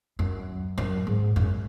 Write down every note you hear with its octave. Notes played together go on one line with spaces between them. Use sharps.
F#2
F#2
G#2
F#2